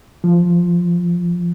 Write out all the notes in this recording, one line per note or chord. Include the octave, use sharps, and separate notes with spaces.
F3